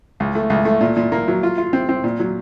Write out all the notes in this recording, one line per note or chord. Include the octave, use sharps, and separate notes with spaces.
C#2
A3
C#2
A3
A#2
A#2
A#3
F#3
F4
F4
C4
C4
A#2
F#3